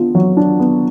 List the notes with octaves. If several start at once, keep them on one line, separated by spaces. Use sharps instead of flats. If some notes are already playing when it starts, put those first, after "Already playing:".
Already playing: B3 D4 F4
F#3
D4
B3